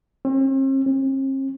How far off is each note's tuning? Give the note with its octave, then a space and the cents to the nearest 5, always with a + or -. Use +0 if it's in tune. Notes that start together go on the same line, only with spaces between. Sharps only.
C4 +45
C4 +45